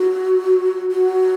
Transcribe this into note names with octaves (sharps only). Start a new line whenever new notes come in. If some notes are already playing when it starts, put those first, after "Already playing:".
Already playing: F#4
F#4